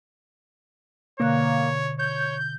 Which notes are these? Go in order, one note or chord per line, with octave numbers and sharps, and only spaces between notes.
B2 D3 A#3 C#5 F#6
C#5 G6